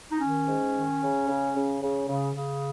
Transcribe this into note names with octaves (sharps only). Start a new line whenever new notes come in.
D#4
D#3 C#4
G#2
D#3
C#3
C#3
C#3
C#3
C#3
C#3